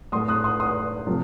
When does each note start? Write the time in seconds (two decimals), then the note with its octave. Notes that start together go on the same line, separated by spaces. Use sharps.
0.12 A2 A3 C6 D#6
0.28 D#6 F#6
0.44 C6 D#6
0.60 C6 D#6
1.07 C3 F3 A3